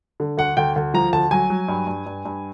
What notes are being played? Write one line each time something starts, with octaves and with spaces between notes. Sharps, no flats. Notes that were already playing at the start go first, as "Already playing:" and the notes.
D3
D2 F#5
D2 G5
D2
F3 A#5
D2 A5
F#3 G#5
F#3
G2
G2
G2
G2